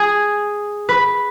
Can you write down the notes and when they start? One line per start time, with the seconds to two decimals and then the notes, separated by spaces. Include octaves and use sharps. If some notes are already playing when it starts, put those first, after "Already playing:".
Already playing: G#4
0.89 B4